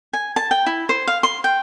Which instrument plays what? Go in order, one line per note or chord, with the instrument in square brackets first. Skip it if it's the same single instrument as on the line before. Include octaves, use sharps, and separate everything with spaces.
[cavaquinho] G#5
A5
G5
E4
C5
F5
C6
G5